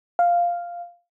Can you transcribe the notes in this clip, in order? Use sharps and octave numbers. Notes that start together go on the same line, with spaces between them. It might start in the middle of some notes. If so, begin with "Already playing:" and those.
F5